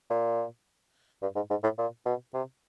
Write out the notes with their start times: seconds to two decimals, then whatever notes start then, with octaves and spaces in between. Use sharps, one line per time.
0.10 A#2
1.22 G2
1.36 G#2
1.50 G#2
1.63 A2
1.78 A#2
2.06 B2
2.34 C3